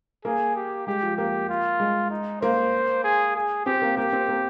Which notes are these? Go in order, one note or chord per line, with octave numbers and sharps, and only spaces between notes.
A#3 G#4
G4
G#3 G4
F3
A#3 G4
F4
G#3
D#4
A#3 C5
G#4
G#4
C4 G4
A#3
A#3 G4
C4
A#3